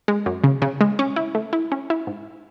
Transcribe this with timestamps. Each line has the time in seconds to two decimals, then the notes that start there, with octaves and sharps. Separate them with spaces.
0.08 G#3
0.26 F#2
0.44 C#3
0.62 C#3
0.81 G#3
0.99 C#4
1.16 E4
1.35 A3
1.53 E4
1.72 C#4
1.90 E4
2.07 G#2